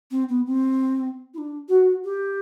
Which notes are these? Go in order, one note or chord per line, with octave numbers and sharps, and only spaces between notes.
C4
B3
C4
E4
D4
F#4
G4